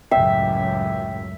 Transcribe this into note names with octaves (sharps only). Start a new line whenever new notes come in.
C#2 F#2 A2 E5 G5